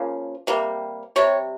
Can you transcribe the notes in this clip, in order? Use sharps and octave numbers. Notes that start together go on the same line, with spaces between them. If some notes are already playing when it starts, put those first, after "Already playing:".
Already playing: C#3 F3 A#3
C3 G3 A#3
C3 G3 C#5